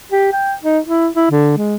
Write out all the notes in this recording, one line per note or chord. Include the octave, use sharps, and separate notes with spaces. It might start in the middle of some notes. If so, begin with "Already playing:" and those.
G4
G5
D#4
E4
E4
D3
G#3